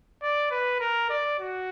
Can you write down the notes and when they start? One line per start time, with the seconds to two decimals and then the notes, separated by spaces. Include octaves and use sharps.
0.22 D5
0.51 B4
0.80 A#4
1.10 D5
1.39 F#4